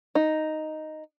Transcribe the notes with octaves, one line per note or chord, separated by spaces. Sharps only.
D#4